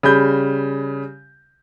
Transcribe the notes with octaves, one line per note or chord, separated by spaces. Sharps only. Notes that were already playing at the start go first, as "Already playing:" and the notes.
C#3 G3 B5 G6